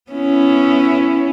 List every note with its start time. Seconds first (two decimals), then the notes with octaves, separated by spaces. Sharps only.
0.11 B3 C#4 E4